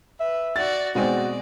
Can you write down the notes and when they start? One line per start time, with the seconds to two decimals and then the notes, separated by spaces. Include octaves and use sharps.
0.20 B4 E5
0.56 F#4 D5 A6
0.95 B2 G#3 C4 F#4 D5